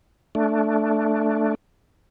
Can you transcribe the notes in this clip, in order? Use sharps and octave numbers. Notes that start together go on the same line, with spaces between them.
A3 D4